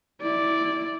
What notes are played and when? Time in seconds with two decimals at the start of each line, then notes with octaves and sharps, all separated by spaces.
0.21 E4 D5